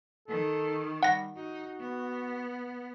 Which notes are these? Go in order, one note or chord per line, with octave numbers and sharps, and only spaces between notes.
D#3 A4
G3 F#5 A#6
D#4 F#4
B3